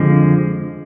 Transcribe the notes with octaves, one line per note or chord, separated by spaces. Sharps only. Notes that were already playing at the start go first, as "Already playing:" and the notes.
Already playing: F2 D3 F3 G#3